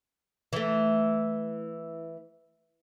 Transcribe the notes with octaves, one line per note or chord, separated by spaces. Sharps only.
E3 A3